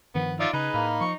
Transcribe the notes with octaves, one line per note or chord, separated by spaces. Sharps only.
G2 D#3 F3 B3
D#4 F4 D5 E5
C#3 D#4 G#4 B4
A2 A#3 B5 F6
F3 C#6